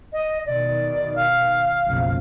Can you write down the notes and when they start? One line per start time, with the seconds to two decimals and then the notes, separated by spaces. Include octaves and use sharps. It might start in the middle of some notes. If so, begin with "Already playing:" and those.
0.13 D#5
0.46 B2 D#3 D5
1.16 F5
1.85 F#1 B1 F3